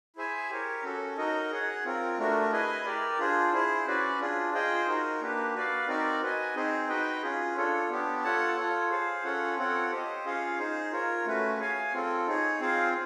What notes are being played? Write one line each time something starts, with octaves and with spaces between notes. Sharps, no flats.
E4 G#4 C5 E5 G#5
G4 A#4 C#5
C#4 F#4 A4
D#4 F#4 A#4 D#5
G#4 C#5 F#5
C4 F4 A#4
A3 D4 F#4 A#4
E4 G#4 B4 D#5 G#5
G4 A#4 D5
D4 F4 G#4 C5
E4 G#4 C5
C#4 F#4 B4 D5
D4 F4 G#4
F4 G#4 C5 D#5 G5
D#4 F#4 A#4
A#3 D4 G4 B4
F#4 B4 D5 F5
C4 D#4 F#4 A#4 D5
F#4 B4 D#5 G#5
C4 D#4 G#4 C5
D#4 F#4 B4 D#5 G5
C#4 F4 G#4
D4 F4 A4 C#5
B3 D4 G4
F4 A4 C#5 F#5 A5
F4 A4 C#5
G#4 C5 F5
C#4 F4 A4 C#5 F#5
C4 F4 A4 C#5 F#5
G4 C5 D#5
C#4 F4 G#4 C#5 F5
D#4 G#4 C5
F4 A#4 C#5
A3 C#4 F#4 B4
G#4 C#5 F5 G#5
C4 F4 A4
D#4 G#4 C#5
C4 F4 G#4 C5 F5